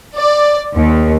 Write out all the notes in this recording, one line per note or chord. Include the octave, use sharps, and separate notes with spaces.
D5
D#2